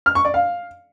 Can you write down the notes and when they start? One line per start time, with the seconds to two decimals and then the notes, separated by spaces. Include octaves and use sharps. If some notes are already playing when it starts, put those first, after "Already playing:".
0.06 F6
0.15 C#6
0.25 D5
0.34 F5